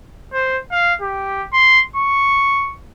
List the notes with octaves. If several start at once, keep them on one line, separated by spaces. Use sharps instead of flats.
C5
F5
G4
C6
C#6